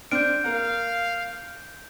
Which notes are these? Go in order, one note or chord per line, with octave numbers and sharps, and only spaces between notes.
C4 D4 F6 G6 D7
A#3 F5 A#5